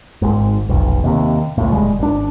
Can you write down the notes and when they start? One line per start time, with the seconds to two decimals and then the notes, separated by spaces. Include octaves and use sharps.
0.22 G#1 G#2
0.69 F1 B1
1.04 D#2 C3
1.58 C#2 A2
1.72 D#1 G3 G#3
1.99 G#1 D4